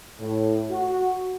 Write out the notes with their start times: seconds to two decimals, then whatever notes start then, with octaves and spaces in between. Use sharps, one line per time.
0.20 A2
0.71 F#4